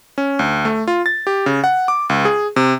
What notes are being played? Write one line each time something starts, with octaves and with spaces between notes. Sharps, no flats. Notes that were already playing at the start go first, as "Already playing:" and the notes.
C#4
D2
A3
F4
A6
G4
C#3
F#5
D6
C#2
G#4
C3